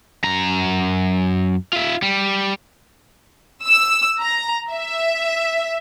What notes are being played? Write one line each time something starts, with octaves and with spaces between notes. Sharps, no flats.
F#2 A#5
F4 E5
G3
E6
A#5
E5